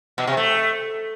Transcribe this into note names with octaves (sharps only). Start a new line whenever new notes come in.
B2
C3
A3